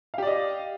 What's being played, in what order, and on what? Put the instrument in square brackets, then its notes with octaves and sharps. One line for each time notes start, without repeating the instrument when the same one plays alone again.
[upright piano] F5
G4
D5
D#5